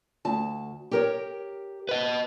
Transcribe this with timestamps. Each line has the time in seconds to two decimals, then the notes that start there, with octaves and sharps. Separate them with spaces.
0.25 D2 A5
0.91 G4 A#4 C#5
1.89 B4 D#5